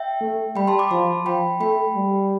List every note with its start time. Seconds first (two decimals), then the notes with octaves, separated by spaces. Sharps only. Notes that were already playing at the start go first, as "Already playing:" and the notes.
Already playing: E5 G5
0.21 A3
0.56 G3 G5 B5
0.68 A5 C6
0.79 B5 D6
0.90 F3 A5 C6
1.26 F3 G5 B5
1.61 A3 G5 B5
1.95 G3